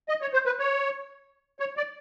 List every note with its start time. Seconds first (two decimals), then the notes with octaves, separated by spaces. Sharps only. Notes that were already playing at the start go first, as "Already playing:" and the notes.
0.09 D#5
0.22 C#5
0.33 C5
0.46 B4
0.59 C#5
1.60 C#5
1.77 D5